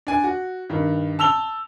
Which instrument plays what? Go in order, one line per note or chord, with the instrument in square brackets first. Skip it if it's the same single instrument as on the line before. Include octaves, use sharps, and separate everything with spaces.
[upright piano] D4 G#5
F#4
G2 D#3
A5 E6 F7 G7